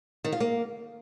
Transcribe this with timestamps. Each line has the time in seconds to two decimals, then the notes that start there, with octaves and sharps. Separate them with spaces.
0.24 D#3
0.32 F4
0.40 A#3